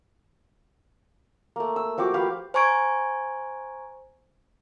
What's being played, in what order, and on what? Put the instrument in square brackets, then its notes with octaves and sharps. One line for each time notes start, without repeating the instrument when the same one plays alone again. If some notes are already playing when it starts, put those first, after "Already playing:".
[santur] A3 A#3
E6
F3 F#4 G4 D6
G4 B4 F5
[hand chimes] C5 G#5 A#5 C#6 G#6 D7